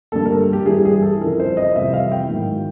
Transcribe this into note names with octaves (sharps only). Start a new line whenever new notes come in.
G2 D3 G3 A#3 A4
A#4
G4
G2 E3 G3 G#4
G#4
A4
F2 C#3 E3 A#4
C5
D#5
F2 C3 E3 G3 E5
F5
G5
G#2 D#3 F#3